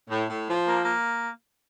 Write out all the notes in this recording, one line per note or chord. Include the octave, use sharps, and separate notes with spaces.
A2
A2
F3
A#3
A#3